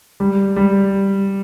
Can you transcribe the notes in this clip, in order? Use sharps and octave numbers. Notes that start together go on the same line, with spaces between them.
G3
G3